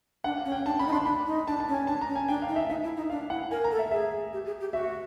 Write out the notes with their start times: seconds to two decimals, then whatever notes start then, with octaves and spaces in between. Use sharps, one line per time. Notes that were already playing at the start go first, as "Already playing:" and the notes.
0.24 D4 F#5
0.37 F5
0.45 C#4
0.52 G5
0.66 D4 A5
0.79 C#4 B5
0.87 D#4
0.92 D4 C6
1.06 D4 B5
1.27 D#4
1.47 D4 A5
1.60 A5
1.68 C#4
1.74 G#5
1.87 D4 A5
2.01 A#5
2.08 C#4
2.15 G#5
2.29 D4 G5
2.42 F5
2.48 D#4
2.56 E5
2.70 D#4 E5
2.84 E4
2.97 D#4
3.10 D4 F5
3.30 E4 F#5
3.51 A#4 G#5
3.64 A#5
3.72 A4
3.79 E5
3.91 G#4 E5
4.33 G4
4.46 G#4
4.60 G4
4.73 F#4 E5